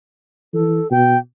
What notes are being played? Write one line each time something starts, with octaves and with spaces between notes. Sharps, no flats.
E3 A4
B2 G5